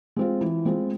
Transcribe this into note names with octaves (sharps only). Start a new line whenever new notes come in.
G#3 C4 F4
E3
G#3 C4 F4